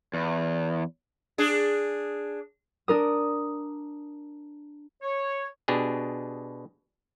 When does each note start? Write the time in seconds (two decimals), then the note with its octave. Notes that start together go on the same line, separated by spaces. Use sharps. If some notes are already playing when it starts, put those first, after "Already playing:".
0.14 E2
1.38 D4 G#4
2.88 D4 A#4 D#6
5.02 C#5
5.68 B2 D4 G4 G#4